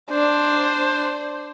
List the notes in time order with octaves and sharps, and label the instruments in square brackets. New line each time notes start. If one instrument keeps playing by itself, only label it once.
[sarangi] D4 [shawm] C5